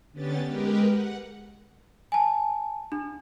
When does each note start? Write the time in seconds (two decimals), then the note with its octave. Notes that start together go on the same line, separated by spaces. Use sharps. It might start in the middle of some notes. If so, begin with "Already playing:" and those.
0.13 D3 B3 C#4 G4 A6
0.46 G#3 G4 A#4 B4
0.87 F#5
2.12 G#5 A5
2.92 D4